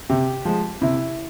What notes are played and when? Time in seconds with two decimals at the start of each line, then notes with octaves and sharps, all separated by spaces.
0.10 C3 G4
0.45 F3 G#3
0.81 C3 E4